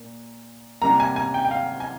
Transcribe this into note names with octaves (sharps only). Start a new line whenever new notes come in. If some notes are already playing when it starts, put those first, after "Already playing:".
Already playing: A#2 A#3
C3 G3 A#3 A#5
G#5
G#5
G5
G5
F5
G#5